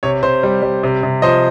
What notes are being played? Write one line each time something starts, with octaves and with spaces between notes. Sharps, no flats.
C3 C#5
C3 C5
G3
G3
C3
C3
F3 C5 D#5